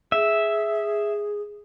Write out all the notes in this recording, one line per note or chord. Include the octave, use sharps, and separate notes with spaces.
G#4 E5